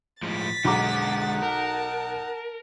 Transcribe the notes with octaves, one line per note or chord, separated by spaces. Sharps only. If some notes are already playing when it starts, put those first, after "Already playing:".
A2 F3 G#3 A6 B6
B1 D3 G#3 D#4 F#5 A#5 D6
A#4 A5